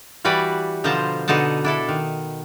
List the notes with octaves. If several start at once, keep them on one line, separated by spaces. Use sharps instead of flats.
E3 G3 F#4 B4 D5
B2 D3 F3 C5 A5 A#5
B2 D3 D#4 F#5 A5
D4 E4 A4
D#3